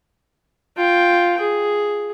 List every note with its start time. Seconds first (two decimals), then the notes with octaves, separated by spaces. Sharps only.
0.77 F4 G5
1.40 G#4